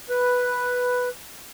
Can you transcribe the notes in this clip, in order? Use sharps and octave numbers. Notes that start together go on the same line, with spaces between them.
B4